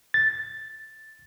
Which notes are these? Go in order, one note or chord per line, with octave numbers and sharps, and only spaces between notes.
A6